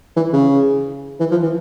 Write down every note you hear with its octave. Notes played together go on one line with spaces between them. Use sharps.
E3
C#3
E3
F3
E3